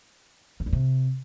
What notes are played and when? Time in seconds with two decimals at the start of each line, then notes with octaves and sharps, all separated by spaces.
0.60 F#2
0.66 E2
0.73 C3